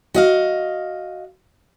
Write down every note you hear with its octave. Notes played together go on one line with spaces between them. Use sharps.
F#4 D#5 F5